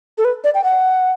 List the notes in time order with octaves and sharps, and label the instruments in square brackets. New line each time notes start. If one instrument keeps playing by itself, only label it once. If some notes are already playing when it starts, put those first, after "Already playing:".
[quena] A4
B4
D5
G5
F#5